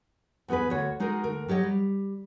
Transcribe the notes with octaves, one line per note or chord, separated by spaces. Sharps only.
E2 B3 F4 G#4 B4
D2 F#4 C#5
G#3 D#4 F#4 G#4 A#4
D2 A#4
F#3 G4 C#5 D#5 G5
G3